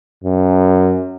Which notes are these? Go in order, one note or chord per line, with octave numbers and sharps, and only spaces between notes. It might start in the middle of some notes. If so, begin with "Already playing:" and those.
F#2